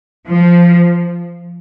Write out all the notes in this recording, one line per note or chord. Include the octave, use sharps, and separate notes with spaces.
F3